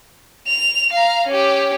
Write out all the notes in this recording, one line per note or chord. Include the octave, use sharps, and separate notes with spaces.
F7
F5 A#5
C#4 G4